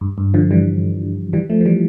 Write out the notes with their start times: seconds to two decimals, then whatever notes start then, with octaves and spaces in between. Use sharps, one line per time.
0.01 G2
0.18 G2
0.34 D3 F3
0.51 E3 G3
1.33 E3 G3
1.50 F3 A3
1.61 F3
1.66 E3 G3